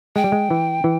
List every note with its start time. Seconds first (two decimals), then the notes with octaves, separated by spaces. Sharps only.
0.16 G#3 G5
0.24 G3
0.32 G#3
0.51 E3
0.84 E3